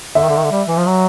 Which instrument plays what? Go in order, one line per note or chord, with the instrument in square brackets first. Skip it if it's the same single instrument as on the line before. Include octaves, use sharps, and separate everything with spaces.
[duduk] D3 [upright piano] E5
[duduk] D#3
D3
D#3
D3
G3
E3
F3
F#3